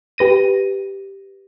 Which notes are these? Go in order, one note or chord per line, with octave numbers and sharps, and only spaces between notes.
G4 B4 A#6 D#7